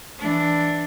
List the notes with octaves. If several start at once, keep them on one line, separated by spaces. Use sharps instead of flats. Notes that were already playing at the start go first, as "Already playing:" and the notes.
E3 D4